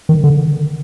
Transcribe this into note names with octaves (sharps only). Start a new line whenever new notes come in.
D#3
D3